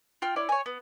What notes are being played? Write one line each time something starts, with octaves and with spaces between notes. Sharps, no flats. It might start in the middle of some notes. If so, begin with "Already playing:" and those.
F4 G5 F6
E4 C#5 D5
C#5 G#5
B3